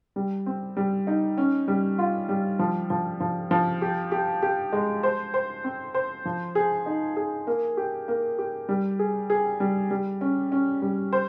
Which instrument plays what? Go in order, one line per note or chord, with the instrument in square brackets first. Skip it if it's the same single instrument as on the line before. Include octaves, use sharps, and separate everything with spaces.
[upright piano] G3
C4
G3
D#4
C#4
G3
F4
G3
F3
F3
F3
F3
G4
G4
G4
G#3
C5
C5
C4
C5
F3
G#4
D#4
G#4
A#3
G4
A#3
G4
G3
G#4
G#4
G3
G3
C#4
C#4
G3
C5